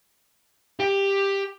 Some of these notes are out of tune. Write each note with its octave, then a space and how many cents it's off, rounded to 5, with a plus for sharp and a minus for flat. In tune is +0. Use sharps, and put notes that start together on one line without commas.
G4 +10